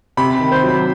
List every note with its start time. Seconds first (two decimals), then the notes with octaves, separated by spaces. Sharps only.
0.17 C3 B5
0.40 D#3
0.52 C5
0.64 F#3 B5